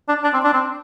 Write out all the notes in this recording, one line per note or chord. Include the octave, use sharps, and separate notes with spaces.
D4
D4
C4
D4
C4